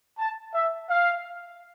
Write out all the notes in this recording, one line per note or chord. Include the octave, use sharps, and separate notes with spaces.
A5
E5
F5